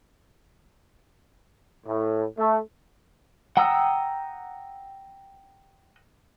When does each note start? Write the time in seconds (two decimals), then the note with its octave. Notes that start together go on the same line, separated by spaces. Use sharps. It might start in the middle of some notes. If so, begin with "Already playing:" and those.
1.87 A2
2.38 A3
3.57 F#5 G5 A#5 D#6 E6